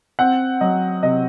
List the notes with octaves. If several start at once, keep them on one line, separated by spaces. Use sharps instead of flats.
C4 F#5
F#3 D#5
C3 D#5